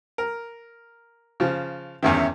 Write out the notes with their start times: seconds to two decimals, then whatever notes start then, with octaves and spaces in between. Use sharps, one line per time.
0.18 A#4
1.40 C#3 F3
2.03 E2 G2 D#3 C#4 E5